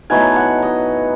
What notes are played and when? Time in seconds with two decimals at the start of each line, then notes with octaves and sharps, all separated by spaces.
0.10 A2 F#3 B3 D#4 G#5
0.36 F#5
0.62 D#5